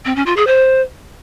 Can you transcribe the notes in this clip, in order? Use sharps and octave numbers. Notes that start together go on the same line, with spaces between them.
C4
C#4
F4
G#4
C5